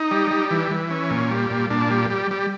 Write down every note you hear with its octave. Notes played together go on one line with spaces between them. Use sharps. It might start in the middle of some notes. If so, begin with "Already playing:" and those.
Already playing: D#4
G3
G3
E3
E3
C#4
A#2
G3
A#2
A#2 D4
G3
G3
G3